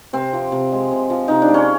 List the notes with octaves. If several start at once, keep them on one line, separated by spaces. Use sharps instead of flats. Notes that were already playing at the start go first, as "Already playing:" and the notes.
C3 C4
F3
C3
G#3
C3
F3
C3 D#4
D4
G#3
C#4